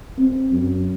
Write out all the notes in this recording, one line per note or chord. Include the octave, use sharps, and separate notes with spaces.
C4
F#2